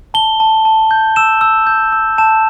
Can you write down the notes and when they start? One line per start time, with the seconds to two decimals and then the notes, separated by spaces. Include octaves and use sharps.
0.14 A5 G7
0.40 A5
0.65 A5
0.91 G6
1.16 E6 E7
1.41 E6
1.67 G6
1.92 E6
2.18 A5 E7